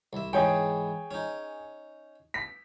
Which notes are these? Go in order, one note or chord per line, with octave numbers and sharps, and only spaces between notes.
C2 E5
G#2 E3 G#4 C#5 G5
C#4 D#4
B6